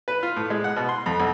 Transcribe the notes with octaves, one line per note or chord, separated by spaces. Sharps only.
B4
F4
A2
G#3
F#5
B2
C6
F2
B1